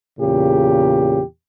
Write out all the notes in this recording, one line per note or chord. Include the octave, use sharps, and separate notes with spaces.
E2 A#2 C#3 G4